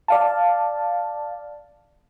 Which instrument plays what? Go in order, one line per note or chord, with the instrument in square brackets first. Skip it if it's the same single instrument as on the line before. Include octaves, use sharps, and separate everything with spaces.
[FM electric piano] D5 F5 A5